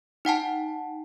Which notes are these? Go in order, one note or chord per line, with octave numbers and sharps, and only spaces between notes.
D#4 F#5 G5 A5